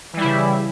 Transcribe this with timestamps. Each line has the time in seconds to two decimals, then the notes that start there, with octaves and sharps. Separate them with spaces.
0.13 E3
0.17 G3
0.21 E4
0.24 C#3